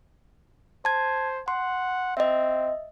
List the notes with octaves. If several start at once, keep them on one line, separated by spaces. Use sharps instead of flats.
C5 A5 G#6
F#5 C6
C4 D#5 E5